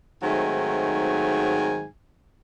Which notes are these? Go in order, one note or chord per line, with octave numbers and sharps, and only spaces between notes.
G#2 D#3 F#3 A3 C4 G#5